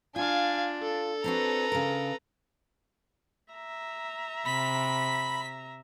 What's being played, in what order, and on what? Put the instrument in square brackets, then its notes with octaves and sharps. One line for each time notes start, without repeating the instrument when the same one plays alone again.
[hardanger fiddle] D4 [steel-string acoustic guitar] F4 [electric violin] F5 G#5
[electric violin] A4
[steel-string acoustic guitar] C4 D4 F#4 [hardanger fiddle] B4 A#5
[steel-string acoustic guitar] C#3 A#4
[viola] E5 A#5
[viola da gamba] C3 [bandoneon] B5 [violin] B6